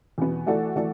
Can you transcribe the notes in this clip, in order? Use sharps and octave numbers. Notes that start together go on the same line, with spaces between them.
E2 B2 B3
E3 A3 F#4 A4 D5
E3 A3 F#4 A4 D5